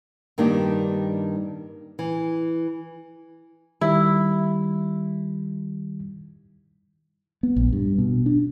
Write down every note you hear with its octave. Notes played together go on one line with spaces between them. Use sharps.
G2 D#3 A#3 D4 D#4 G4
E3
D#3 G3 E4
B3
A#1
G2
B2
D4